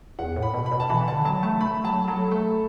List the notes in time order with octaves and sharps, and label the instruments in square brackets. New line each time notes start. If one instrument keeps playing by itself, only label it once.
[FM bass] E2 [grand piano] F#5
[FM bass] A2
[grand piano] B5
[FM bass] B2
[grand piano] B5
[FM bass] B2
[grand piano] A5
[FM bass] E3 [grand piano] B5
[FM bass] D3 [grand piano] A5
[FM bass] F#3 [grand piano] A5
[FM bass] A3 [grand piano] A5
[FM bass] A3 [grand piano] B5
[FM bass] F#3 [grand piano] A5
[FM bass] F#3 [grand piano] A4
[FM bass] A3 [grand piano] A4